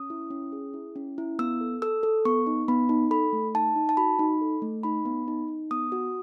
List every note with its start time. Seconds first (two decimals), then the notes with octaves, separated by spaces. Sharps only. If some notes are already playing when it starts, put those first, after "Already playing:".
Already playing: C#4 D#6
0.10 E4
0.30 C#4
0.52 G#4
0.74 E4
0.96 C#4
1.18 E4
1.39 B3 E6
1.61 A4
1.82 A4 E6
2.03 A4
2.25 B3 C#6
2.47 D#4
2.68 B3 B5
2.89 D#4
3.11 A4 B5
3.33 A3
3.54 D#4 A5
3.76 D#4
3.89 A5
3.97 F#4 B5
4.19 D#4
4.41 A4
4.62 A3
4.83 D#4 B5
5.05 B3
5.28 D#4
5.48 D#4
5.71 B3 D#6
5.92 F#4